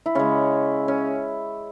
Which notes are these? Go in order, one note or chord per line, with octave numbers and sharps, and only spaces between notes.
E4
C#3 G#3 C#4
C#4